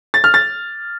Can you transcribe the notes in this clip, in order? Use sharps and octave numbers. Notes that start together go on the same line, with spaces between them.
A6
F6
A6